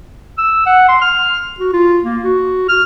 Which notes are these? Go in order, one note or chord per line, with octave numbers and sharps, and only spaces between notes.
E6
F#5
C6
F6
F#4
F4
A#3
F#4
F6